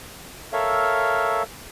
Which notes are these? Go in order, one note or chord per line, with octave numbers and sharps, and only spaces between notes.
A4 A#4 C#5 E5 F5